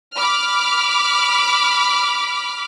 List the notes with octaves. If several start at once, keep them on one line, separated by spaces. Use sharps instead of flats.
B5 D6 F6